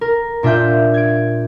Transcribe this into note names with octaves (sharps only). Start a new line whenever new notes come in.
A#4
A#2 D4 F4 E5 G6
G#6 D7